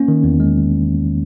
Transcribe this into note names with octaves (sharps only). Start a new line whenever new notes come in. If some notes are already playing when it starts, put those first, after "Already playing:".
Already playing: A#3 C#4
D#3
E2
G#3